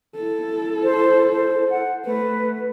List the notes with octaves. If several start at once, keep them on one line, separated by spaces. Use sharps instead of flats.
E4 A4
C5
C5
F#5
A3 B4